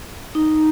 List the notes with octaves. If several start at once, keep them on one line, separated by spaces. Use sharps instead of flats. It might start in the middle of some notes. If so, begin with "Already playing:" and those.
D#4